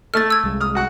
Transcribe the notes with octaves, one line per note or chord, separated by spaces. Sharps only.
A3 A4 F6 A6
E6 G#6
C2 G#3
D#6 F6
F#4 F#5